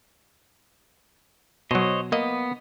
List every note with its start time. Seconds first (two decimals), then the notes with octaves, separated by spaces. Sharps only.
1.71 B2 F#3 C5 C#5 D#5
2.12 A#3 B3 D#5